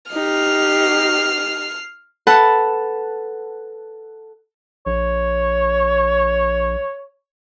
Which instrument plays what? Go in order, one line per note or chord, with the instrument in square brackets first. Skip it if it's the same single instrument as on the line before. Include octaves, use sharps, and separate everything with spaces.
[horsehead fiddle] D#4 G4 [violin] F6 C7
[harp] A4 B4 F#5 A5
[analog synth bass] A#1 [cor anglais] C#5